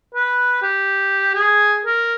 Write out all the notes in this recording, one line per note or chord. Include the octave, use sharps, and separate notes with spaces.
B4
G4
G#4
A#4